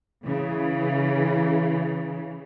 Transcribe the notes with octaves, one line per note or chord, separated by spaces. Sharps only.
C#3 E3